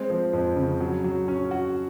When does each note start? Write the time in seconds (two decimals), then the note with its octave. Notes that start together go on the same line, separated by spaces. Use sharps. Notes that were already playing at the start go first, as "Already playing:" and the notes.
Already playing: G#3 C4
0.10 F3
0.33 F2
0.56 C#3
0.80 F#3
1.04 F#3
1.28 C#4
1.51 F#4